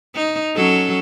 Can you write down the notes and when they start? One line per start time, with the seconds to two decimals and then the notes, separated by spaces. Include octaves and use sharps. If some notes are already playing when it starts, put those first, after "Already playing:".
0.15 D#4
0.56 F#3 C#4 A4